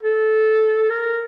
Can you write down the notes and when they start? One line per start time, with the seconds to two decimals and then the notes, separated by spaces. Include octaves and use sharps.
0.03 A4
0.90 A#4